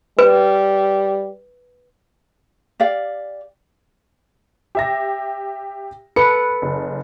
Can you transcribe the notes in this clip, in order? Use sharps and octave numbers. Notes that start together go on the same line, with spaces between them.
G3 B4
G4 D5 F5
G4 E5 A#6
A4 B4 C#7
F#1